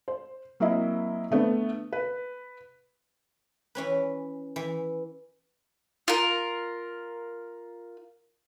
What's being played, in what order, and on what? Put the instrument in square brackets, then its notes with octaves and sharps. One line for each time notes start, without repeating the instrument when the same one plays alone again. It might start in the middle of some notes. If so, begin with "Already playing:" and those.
[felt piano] C5
F#3 A#3 C4 E4 D#5 E5
D3 A3 B3
B4
[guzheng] E3 C#4 B4
E3
[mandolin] F4 A#4